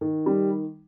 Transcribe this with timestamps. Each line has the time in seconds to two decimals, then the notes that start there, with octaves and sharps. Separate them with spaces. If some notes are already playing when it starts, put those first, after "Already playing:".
0.01 D#3
0.26 G3